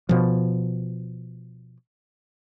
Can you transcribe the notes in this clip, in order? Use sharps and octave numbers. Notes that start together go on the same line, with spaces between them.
B2 F3